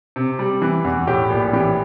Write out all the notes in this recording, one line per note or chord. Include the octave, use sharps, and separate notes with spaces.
C3
G3
E3
E2
A2 G4
A#1
E3 G4